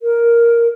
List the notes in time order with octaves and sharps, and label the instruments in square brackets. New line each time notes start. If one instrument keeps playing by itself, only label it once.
[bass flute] A#4